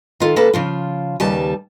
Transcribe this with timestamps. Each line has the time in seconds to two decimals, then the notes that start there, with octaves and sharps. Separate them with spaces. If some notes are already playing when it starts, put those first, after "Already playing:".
0.20 D#3 F4 A4
0.36 C#3 A#3 A4 B4 A5
0.54 C#3 F3 F4
1.20 D#2 C#3 G3 B4 A5